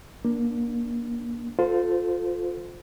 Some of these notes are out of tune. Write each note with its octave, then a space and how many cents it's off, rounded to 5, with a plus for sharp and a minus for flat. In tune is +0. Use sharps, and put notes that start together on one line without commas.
A#3 +25 D4 -5
F4 +20 A4 +0 C5 -25